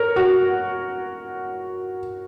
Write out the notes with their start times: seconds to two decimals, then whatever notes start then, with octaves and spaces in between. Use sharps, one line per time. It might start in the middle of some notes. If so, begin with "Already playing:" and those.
Already playing: A#4 C#5
0.16 F#4